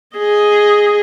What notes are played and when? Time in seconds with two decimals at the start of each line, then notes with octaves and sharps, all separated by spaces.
0.17 G#4 D#5